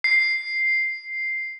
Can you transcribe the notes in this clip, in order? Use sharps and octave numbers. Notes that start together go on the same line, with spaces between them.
C7